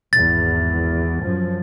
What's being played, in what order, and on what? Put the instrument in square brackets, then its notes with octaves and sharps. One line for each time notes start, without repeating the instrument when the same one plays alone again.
[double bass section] G#1 E2 [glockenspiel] A6
[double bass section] F#2 F3